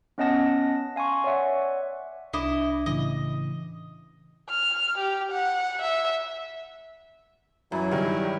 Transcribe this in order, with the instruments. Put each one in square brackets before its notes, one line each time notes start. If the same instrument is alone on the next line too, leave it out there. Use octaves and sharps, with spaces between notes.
[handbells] B3 C#4 D#5 F#5 A5 A#6
F5 G#5 C6 C#6
C#5 D5 E5 F#5
[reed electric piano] C2 D4 D6 [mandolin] E4 D#5
[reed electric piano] A2 C#3 E3 [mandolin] D#5
[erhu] F6
G4
F#5
E5
[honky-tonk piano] F#2 [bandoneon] E3 F#3 E4
[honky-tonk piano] G2 D#3 G3